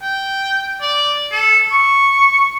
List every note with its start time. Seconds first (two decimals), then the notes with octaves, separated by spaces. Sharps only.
0.02 G5
0.81 D5
1.32 A4
1.72 C#6